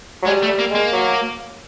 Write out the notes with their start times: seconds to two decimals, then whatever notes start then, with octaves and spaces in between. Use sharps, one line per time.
0.22 F#3
0.26 G3 G#3
0.43 A3
0.48 G3
0.59 A#3
0.70 G#3 A#3
0.92 F#3